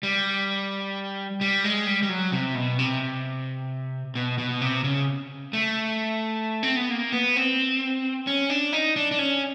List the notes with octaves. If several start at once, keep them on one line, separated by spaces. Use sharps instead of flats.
G3
G3
G#3
G3
G3
F#3
C3
B2
C3
B2
B2
C3
C#3
A3
C4
B3
A#3
B3
C4
C#4
D4
D#4
D4
D4
C#4